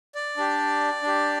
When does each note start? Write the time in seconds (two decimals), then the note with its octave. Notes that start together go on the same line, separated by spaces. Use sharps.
0.15 D5
0.37 D4 G4
1.02 D4 G4